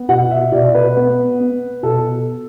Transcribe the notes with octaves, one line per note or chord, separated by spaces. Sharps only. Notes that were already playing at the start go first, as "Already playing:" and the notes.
Already playing: B3
B2 F#5
E5
B2 D5
B4
B3
B3
B2 A4